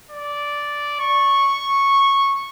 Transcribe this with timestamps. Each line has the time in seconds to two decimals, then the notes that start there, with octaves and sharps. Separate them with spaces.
0.11 D5
1.00 C#6